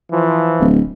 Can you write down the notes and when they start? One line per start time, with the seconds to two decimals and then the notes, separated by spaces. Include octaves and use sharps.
0.12 E3 F3
0.60 D1